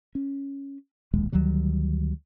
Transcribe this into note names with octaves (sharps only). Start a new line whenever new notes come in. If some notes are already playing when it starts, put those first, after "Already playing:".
C#4
D1 A#1 D#2 G#3
D2 D#3 F#3 G3